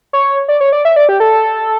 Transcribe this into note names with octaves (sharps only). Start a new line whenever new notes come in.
C#5
D5
C#5
D5
E5
D5
G4
A4